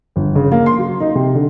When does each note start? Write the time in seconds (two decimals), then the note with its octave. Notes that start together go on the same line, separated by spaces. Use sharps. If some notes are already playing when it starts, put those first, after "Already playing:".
0.16 G1
0.35 C#3
0.52 A#3
0.66 C6
0.78 F#3
1.00 D#4
1.15 C3
1.35 D3